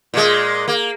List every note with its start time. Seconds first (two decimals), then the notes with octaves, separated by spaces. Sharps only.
0.14 A#2 G#3
0.68 A#3